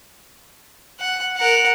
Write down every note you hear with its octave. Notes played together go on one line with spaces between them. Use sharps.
F#5
A#4 F#5